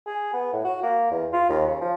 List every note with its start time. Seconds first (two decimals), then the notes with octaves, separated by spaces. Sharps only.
0.06 G#4
0.34 B3
0.53 A2
0.65 F#4
0.83 A#3
1.11 E2
1.33 F4
1.49 D#2
1.67 C#3
1.81 F3